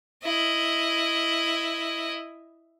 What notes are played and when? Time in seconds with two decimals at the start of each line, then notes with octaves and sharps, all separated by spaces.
0.24 E4 D#5